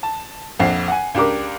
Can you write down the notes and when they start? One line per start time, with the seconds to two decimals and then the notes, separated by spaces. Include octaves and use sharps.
0.03 A5
0.60 A#1 F2 F#5 C7
0.88 F#5 G#5
1.15 C#2 D4 G4 A#4 D6